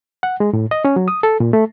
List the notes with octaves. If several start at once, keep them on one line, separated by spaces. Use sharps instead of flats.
F#5
G#3
A2
D#5
C#4
F#3
D#6
A4
A#2
A3